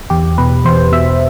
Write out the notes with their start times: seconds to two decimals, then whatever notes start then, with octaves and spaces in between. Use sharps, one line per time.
0.10 E2 G4
0.38 B2 B4
0.65 E2 C5
0.92 B2 E5